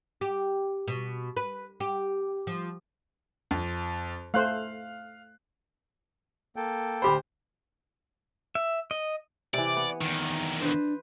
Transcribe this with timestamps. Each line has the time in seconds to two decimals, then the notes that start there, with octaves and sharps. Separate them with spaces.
0.21 G4
0.88 B2
1.37 B4
1.80 G4
2.47 F3
3.51 F2
4.34 A3 C5 F5 F#6
6.56 A#3 A4 G5
7.02 D2 G4 C5 B5
8.55 E5
8.91 D#5
9.54 C3 E3 D5
9.76 B3
10.01 E2 D#3
10.61 D4 B4 C5